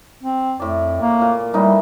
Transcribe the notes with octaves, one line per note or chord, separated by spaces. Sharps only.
C4
F2 A2 D5
A#3
A#2
A2 E3 G3 D#4